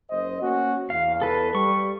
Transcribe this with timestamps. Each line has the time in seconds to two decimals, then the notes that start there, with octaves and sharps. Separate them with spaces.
0.11 F#1 C5 D#5
0.42 A#3 C#4 F#4
0.90 E2 F5
1.22 A4 B4
1.55 G3 C#6